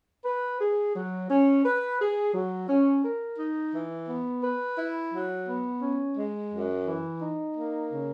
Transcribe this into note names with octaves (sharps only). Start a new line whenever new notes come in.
B4
G#4
F#3
C#4
B4
G#4
F#3
C#4
A#4
D#4
E3
B3
B4
E4
F#3
B3
C#4
G#3
F#2
E3
D#4
A#3
C#3